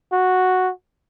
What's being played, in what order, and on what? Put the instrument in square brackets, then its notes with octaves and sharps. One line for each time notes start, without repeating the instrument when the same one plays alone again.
[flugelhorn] F#4